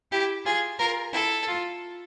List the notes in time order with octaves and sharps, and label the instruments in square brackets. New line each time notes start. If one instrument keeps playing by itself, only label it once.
[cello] E4 [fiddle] G4
[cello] F4 [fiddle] G#4
[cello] F4 [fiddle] A#4
[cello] E4 [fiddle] A4
[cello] F4